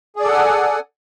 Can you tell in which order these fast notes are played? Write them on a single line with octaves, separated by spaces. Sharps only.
G#4 D5 A4 F#5 G#5